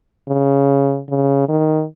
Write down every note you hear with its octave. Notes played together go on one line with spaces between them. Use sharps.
C#3
C#3
D#3